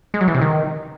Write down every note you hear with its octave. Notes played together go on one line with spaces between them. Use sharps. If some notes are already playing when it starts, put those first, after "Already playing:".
G#3
F#3
E3
C3
D#3